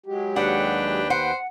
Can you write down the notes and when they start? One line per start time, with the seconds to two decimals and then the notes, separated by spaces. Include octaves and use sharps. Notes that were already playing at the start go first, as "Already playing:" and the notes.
0.06 F#3 G#3 G4
0.36 D#2 D4 B4 F#5 G5
1.10 C5 F#5